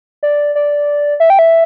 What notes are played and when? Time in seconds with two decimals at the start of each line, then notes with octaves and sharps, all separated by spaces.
0.23 D5
0.55 D5
1.20 E5
1.30 G5
1.39 E5